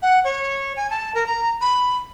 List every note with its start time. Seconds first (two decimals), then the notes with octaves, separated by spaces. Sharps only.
0.02 F#5
0.24 C#5
0.76 G#5
0.90 A5
1.15 A#4
1.26 A#5
1.61 B5